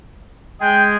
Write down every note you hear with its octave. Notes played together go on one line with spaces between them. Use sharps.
G#3 G#4 G5